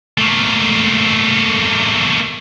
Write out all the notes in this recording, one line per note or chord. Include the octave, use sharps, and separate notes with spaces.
A3 A#3